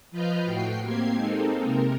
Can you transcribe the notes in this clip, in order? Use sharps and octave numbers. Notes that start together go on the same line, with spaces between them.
F3 F4 B4 D#5 F6 G6
A2 F#4 G5 C7
A#3 C4 G4 G#6 C7
G#3 A#3 C4 D#4 A4
C3 A#4